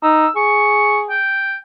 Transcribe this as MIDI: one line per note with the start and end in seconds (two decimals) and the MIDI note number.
0.03 0.27 63
0.03 0.31 88
0.36 1.16 68
0.36 0.98 85
1.10 1.56 79